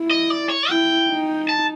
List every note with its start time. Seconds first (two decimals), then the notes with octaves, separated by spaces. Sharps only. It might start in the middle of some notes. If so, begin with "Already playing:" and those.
Already playing: E4
0.11 D#5
0.30 D5
0.49 C#5
0.69 E4 G5
1.09 D#4
1.49 A5